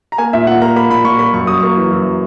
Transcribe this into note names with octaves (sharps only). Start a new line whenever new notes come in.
A#5
A#3 G#5
A#2 E5
A#2 F#5
A#3 A#5
A#3 B5
A#2 B5
A#2 C#6
A#3 B5
F#2 C#6
F#2 D#6
A#3 C#6
E3
F#2